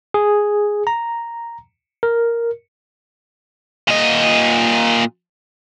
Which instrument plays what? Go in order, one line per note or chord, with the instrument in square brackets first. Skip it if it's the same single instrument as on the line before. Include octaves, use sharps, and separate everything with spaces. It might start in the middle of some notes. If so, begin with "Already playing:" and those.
[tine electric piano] G#4
A#5
A#4
[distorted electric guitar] A#2 D#5